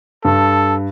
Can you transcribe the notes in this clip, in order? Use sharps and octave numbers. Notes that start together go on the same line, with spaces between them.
G2 A4